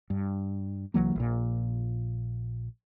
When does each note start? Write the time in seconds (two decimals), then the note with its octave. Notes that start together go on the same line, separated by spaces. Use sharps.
0.10 G2
0.94 C2 E3 F#3 A#3
1.16 A#1 A#2